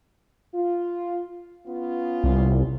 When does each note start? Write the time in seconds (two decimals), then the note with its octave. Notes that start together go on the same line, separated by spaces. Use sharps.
0.54 F4
1.67 B3 C#4 F4
2.24 C2